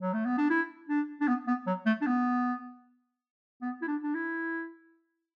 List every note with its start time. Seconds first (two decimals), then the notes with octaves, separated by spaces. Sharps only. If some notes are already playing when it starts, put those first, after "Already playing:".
0.02 F#3
0.14 A3
0.25 B3
0.38 D4
0.50 E4
0.89 D4
1.21 D4
1.28 B3
1.47 B3
1.67 F#3
1.86 A3
2.01 D4
2.07 B3
3.62 B3
3.82 E4
3.88 D4
4.03 D4
4.14 E4